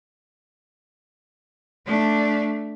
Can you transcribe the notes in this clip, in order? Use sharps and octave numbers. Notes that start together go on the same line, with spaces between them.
A3 D4